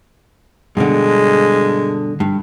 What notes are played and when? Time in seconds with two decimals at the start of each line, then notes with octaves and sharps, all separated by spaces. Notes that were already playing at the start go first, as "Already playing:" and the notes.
0.77 G2 B2 D3 G#3
2.20 G2